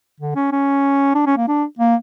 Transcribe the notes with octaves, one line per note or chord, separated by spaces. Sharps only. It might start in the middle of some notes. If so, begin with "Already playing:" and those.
D3
C#4
C#4
D4
C#4
A#3
D4
A#3